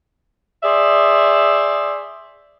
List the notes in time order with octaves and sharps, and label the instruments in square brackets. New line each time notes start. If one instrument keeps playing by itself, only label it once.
[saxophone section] G#4 C5 D5 E5